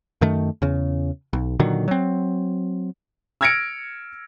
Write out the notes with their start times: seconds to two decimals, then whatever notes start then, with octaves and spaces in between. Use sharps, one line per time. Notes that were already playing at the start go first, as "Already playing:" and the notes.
0.21 F#2 D#3 A3
0.62 E2 C#3
1.33 B1
1.59 A#2 D3 D#3 F#3
1.88 F#3 C4
3.41 E6 F6 G#6 A#6 C#7 D7